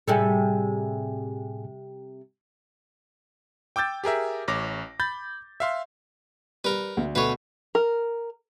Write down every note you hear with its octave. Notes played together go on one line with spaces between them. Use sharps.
A2 C3 G3 G#4 A4 G#5
G5 D6 E6 G6 A6
G4 G#4 A#4 E5
A1 C#5 D6 A#6
B5 G6 A6
E5 F5 C6
G3 A#4 B4
D2
B2 A3 B4 C#5
A#4